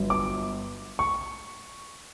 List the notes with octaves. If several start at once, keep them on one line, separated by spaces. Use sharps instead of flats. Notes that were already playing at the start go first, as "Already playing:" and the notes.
Already playing: G1 G2 F#3
D6
C#6